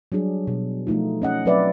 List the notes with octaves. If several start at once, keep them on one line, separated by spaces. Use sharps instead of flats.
F#3 G3 D4 G#4
B2
F3 A3 D#4 F4
C#4 D#5 F#5
F#3 C4 B4 D5 E5